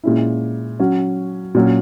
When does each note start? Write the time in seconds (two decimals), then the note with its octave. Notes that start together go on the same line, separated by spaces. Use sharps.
0.04 A#2 G#3 C#4 E4
0.80 F#3 C#4 F#4
1.55 A#2 F#3 C#4